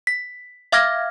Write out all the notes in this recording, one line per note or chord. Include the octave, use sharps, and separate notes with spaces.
B6
E5 F5 D6 F6 G#6 A#6